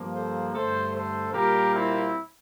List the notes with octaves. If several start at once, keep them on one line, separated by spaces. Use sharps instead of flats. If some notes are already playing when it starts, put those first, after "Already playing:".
Already playing: G2 F3 A#3
A4 C5
G2 D3 A3 A4 C5
A4 C5
A#2 G3 A#3 G4 A#4
C4 E4